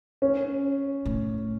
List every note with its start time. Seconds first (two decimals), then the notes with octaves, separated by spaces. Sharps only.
0.22 C#4
1.05 A2